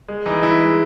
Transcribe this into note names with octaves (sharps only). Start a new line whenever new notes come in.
G#3
E3 D#4
E3 E4
G#3